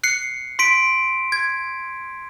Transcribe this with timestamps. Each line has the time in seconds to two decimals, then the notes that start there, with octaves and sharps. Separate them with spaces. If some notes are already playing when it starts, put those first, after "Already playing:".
0.03 F#6 C7 C#7
0.59 C6 B6 D7
1.32 G#6